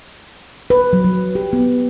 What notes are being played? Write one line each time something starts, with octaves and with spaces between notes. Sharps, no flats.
B4
F#3
F#3
G4
B3